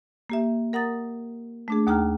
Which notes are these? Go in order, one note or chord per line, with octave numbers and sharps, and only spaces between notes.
A#3 G4 E5
A#4 F#5 A#5 D#6 A6
A3 D4 G#4
D#2 D#4 G#4 G5 A#5 F6